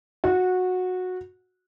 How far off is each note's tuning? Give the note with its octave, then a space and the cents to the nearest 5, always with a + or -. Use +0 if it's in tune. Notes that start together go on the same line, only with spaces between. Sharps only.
F#4 -15